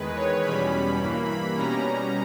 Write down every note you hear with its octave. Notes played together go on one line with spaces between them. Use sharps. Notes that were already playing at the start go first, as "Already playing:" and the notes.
Already playing: E2 D#3 G#3 B4
C#5
E2 B2 G3 C#4 B5
B5
G2 E3 A#3
B5
B2 G3 C#4 A#5